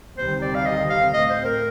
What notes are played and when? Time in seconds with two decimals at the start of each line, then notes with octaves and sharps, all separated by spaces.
0.18 D2 C3 D#3 G3 C4 C5
0.42 D5
0.55 F5
0.66 D#5
0.90 F5
1.14 A2 A3 C4 D#5
1.30 C5
1.45 A#4